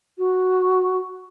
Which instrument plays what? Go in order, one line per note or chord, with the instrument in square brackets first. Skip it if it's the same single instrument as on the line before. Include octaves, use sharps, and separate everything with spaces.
[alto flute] F#4